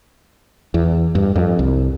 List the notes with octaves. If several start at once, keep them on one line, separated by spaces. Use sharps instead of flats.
E2
G2
F2
C2